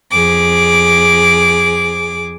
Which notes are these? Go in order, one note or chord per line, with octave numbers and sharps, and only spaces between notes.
F2 G#4 D6